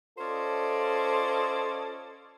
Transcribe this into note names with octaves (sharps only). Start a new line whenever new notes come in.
C#4 F4 A4 C5 D5 D#5